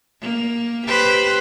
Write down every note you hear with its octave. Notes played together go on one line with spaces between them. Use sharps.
A#3
G4 B4 C5